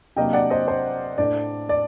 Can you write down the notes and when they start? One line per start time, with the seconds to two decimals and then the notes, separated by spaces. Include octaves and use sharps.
0.16 C3 F#3 A#3 D4 D#5 G5
0.33 D5 F#5
0.50 C5 D#5
0.68 C5
1.18 A2 A3 D4 D5
1.69 D5